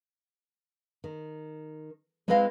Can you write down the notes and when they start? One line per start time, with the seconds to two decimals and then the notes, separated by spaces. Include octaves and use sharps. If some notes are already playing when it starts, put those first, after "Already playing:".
1.04 D#3
2.28 G#3 C4 E4 B4 D#5 F5